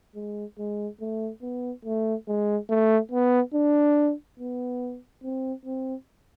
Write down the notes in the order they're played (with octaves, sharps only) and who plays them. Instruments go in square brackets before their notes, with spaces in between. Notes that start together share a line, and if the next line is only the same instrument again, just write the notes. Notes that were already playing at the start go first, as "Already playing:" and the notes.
[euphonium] G#3
G#3
A3
B3
A3
G#3
A3
B3
D4
B3
C4
C4